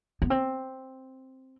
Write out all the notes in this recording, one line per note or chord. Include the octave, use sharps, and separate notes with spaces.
B3
C4